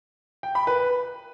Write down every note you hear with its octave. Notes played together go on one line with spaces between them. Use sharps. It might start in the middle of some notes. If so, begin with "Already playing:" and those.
G5
B5
B4